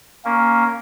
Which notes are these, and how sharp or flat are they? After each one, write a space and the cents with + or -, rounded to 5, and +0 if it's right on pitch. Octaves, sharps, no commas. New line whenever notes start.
A#3 +0 C#4 +0